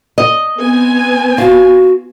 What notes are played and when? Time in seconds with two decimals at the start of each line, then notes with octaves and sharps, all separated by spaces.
0.18 D#5
0.58 B3 C4 G#5
1.38 F4 F#4